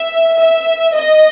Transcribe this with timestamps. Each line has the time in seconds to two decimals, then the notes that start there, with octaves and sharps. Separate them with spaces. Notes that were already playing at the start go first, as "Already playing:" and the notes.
Already playing: E5
0.37 E5
0.94 D#5